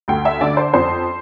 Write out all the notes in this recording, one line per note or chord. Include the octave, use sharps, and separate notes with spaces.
D2 G5
E5
D3 D5
C5
F2 C5